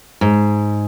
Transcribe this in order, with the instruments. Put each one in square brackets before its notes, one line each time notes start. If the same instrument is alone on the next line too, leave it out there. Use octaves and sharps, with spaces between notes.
[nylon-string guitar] G#2